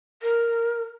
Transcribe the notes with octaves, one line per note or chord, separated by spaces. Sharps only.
A#4